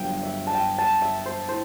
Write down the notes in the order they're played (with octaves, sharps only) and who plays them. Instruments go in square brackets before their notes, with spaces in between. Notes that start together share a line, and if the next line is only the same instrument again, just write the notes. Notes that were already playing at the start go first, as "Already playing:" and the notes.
Already playing: [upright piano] G1 G2 F#3 [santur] G5
[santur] E5
A5
G5
A5
E5
C5
[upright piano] A2 [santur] C5